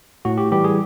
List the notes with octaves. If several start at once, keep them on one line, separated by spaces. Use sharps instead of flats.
A2 F#4
G4
E3 G3 G4
G#4